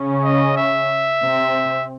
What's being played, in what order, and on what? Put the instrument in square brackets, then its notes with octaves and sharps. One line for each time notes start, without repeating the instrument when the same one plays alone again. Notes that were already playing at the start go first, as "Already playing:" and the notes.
Already playing: [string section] C#3 C#4
[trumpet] D#5
E5
[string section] C3 C4